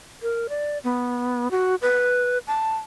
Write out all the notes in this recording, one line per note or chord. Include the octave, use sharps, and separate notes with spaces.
A#4
D5
B3
F#4
B4
A5